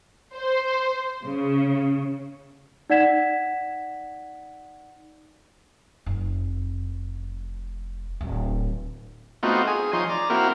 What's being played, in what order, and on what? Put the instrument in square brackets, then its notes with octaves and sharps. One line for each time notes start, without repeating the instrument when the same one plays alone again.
[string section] C5
C#3
[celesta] D#4 D5 F#5 G#6 B6 E7
[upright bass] F1
D1
[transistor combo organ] A3 B3 C4 D#4 F4 F#4
G#4 G#5
F3 D#4 C#5 G#5 C6
D5 A#5
A#3 C4 E4 F#4 A#4